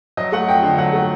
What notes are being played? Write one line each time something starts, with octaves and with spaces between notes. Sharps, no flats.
F#3 D#5
A3 F#5
F2 G5
D3
F#3 F#5
A3